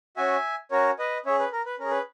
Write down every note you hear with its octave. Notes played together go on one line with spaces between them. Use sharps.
C#4 F#4 E5 G#5
C#4 F#4 A#4 C#5
B4 D#5
C#4 G#4 C#5 E5
B4
A#4
B4
C#4 G#4 A#4
B4